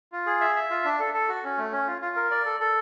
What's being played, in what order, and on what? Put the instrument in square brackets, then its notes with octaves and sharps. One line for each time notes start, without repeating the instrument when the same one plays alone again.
[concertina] F4
G#4
E5
E5
F4
D4
A4
A4
F#4
C#4
A3
C#4
F4
F4
A#4
D5
A4
A4